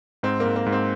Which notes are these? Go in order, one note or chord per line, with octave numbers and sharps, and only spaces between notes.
G#2 C4
A#3
G#2
A#3
G#2
C4